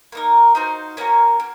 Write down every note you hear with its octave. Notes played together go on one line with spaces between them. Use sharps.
A#3 D#4 A#4
D#4 F#4 C5 F5
A#3 C#4 F#4 A#4
A#3